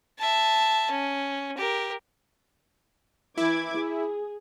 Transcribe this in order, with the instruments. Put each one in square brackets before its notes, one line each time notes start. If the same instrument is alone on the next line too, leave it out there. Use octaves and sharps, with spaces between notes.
[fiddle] E5 A5
C#4
G4 A#4
[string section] E3 D6 G#6 [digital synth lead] E4
[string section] G#4